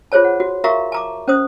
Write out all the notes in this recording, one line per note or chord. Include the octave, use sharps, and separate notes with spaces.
F4 G#4 C5 C#5 A5
F#5
F#4
F#4 A#4 E5 F5 A#5 C#6
A5 A#5 D6
C#4 C5 D#6